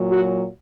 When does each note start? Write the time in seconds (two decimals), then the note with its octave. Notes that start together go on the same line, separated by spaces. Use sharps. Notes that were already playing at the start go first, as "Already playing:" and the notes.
Already playing: A#2 F#3
0.12 F#4